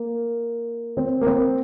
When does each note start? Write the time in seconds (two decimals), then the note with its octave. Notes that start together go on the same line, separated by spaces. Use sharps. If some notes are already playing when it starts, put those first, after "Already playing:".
Already playing: A#3
0.97 C4
1.21 A#3
1.27 C4